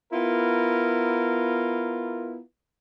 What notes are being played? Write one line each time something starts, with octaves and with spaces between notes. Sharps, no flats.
B3 E4 F4 A#4